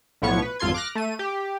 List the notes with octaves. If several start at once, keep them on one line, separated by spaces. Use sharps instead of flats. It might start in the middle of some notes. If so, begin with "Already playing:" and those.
B1 A2 F3 B3 C#5 C#6
B4
G#1 F2 F4 A4 C6 G#6
D6 F6 F#6 A#6
A3 D#7
G4